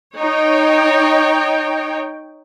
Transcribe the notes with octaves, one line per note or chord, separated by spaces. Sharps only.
D#4 C#5 G5